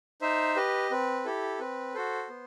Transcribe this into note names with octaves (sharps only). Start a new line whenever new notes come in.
D#4 C5 E5
G4 B4 D#5
C4 B4
E4 G4 A4
C4 B4
F#4 A4 C5
B3